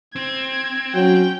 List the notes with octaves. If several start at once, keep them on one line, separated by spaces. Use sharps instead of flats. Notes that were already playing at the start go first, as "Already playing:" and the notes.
C4 G#6
F#3 C#4 G5